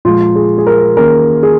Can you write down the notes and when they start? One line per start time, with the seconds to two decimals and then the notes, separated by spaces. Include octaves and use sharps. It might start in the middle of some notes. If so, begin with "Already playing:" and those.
0.05 A#2 F3 G#3 F4
0.35 G#4
0.58 G#4
0.67 A#4
0.97 D#3 A#3 C#4 G#4 A#4
1.43 G#4